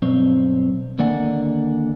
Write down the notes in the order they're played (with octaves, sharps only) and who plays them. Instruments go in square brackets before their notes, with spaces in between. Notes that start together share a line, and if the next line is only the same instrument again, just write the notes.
[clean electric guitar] B1 G2 C4 C#5
D#2 D3 A#3 D5 F#5 G#5